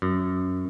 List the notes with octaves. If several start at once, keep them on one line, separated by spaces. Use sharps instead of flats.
F#2